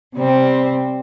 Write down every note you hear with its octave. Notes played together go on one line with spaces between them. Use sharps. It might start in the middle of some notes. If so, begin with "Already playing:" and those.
C3 G3 C4